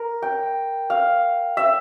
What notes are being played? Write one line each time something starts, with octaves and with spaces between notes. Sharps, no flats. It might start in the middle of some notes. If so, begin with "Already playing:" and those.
Already playing: A#4
G5
F5
E5